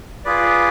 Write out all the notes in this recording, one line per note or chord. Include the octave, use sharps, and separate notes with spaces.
F4 G#4 B4 D5